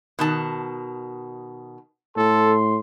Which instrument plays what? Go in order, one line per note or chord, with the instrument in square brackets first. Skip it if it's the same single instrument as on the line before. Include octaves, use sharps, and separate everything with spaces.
[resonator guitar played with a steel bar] B2 D#3 A5
[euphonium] A2 [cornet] A4 [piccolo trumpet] C6